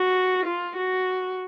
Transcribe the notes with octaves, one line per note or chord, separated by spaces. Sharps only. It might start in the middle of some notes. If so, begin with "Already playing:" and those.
Already playing: F#4
F4
F#4